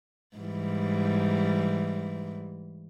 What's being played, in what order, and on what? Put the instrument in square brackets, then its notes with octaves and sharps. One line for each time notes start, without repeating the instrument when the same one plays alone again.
[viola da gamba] G#2 E3 G3